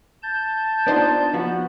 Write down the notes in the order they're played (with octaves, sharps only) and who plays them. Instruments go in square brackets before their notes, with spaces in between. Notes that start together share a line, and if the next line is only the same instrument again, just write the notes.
[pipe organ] A5 G6
[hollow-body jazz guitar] B3 D#4 F4 [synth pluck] D4 C5 D5
[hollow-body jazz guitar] F3 B3 F#4